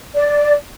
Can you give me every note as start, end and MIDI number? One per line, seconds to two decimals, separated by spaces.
0.15 0.54 74